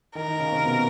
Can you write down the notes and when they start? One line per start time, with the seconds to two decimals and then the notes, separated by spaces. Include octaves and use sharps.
0.15 D#3 D#4 A#4
0.28 D#3 D#4
0.39 C#3 C#4
0.52 C3 C4
0.64 B2 B3